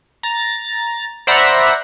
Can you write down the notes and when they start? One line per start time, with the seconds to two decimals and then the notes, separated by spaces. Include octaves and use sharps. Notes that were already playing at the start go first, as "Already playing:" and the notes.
0.23 A#5 A6
1.27 C5 D5 E5 F#5 A#5 B5